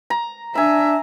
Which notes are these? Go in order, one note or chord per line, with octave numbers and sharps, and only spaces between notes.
A#5
D4 E5 G#5 A#5